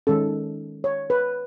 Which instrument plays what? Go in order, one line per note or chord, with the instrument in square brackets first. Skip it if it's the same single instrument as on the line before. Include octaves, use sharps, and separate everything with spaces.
[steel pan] D#3 G#3 C#4 A4
C#5
B4